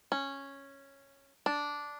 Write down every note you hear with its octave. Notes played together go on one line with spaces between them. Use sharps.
C#4
D4